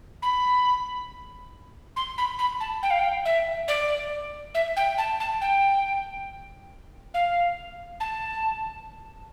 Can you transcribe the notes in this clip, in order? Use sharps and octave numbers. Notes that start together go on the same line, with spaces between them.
B5
C6
B5
B5
A5
G5
F5
G5
E5
D5
E5
G5
A5
A5
G5
F5
A5